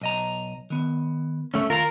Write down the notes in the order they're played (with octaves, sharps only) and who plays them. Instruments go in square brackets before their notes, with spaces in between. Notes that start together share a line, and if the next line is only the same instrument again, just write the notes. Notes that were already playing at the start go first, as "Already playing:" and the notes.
[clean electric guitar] B1 D#5 A#5
D#3 B3
[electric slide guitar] A3 C#4
[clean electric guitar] D#2 A#5 [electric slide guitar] F4 A#4